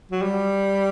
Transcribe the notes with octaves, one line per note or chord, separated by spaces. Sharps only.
F#3
G3